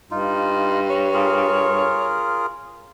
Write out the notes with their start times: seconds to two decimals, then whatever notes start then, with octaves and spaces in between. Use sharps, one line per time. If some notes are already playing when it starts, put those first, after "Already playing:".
0.11 G2 D#4 F4
0.90 C#5
1.14 F4 G#4 A#4